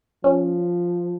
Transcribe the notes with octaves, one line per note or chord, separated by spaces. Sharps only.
F3 C#4